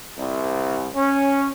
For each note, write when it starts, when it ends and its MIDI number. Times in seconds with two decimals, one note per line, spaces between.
0.18 0.88 36
0.95 1.49 61